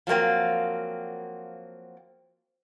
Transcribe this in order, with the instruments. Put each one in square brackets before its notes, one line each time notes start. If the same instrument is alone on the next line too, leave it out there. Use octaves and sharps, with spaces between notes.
[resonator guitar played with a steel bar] F3 F#3 G#3 A#3 C4